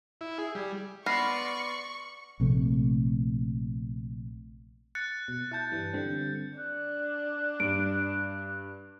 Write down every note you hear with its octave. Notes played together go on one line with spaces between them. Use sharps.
E4
G#4
G3
B3 D5 C6 C#6 F6 A#6 C7
A#1 C3 A3
F#6 A6 C#7
B2
E4 A5 F#6 G6
G2 E3 G3
D3 G3 C4
D4 F#6
G2 D7